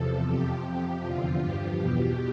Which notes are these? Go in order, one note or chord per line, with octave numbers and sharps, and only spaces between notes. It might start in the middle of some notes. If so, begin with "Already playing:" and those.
Already playing: E2 C3 F3 A4
F2 C3 F3 G4
F2 C3 F3 G4
E2 D3 F3 F4
G2 F3 G4
E2 B2